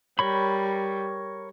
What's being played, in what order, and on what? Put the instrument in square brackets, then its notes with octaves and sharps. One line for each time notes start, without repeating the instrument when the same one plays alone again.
[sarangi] G3 [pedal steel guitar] A#4 C#5 B5